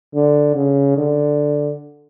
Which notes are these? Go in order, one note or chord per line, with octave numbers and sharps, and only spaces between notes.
D3
C#3
D3